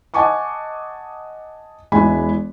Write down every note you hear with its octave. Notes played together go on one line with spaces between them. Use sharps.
D#5 F#5 G#5 A5 C#6 D6
E1 E3 G#3 E4 G#5 B5